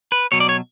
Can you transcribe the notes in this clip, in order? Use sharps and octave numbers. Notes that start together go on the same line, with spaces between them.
B4
B2 F#3 C#5
D5
C#5